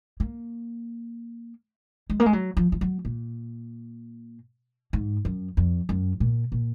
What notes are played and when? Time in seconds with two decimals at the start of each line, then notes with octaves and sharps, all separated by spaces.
0.20 A#3
2.10 G#3
2.20 A#3
2.26 G#3
2.33 F#3
2.57 F3
2.72 F3
2.81 F#3
3.05 A#2
4.93 G#2
5.25 F#2
5.57 F2
5.89 F#2
6.20 A#2
6.52 A#2